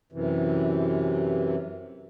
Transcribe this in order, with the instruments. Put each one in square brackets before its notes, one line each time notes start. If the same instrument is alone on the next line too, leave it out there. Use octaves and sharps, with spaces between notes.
[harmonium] F#2 C3 E3